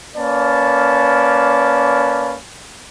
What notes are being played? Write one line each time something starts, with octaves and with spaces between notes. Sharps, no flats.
A#3 C#4 B4 D5 A5